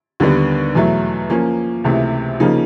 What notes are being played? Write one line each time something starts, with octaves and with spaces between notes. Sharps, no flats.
D#2 D3 G3 B3
E2 B2 F#3 A3
F3 A#3 C#4
C#2 C3 E3 A3
C#3 F3 A#3 D#4